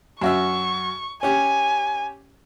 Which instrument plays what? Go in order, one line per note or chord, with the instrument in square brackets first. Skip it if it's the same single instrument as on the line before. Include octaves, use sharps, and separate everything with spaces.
[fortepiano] F#2 F#4 E5 [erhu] C#6
[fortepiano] C#4 G4 [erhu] G#5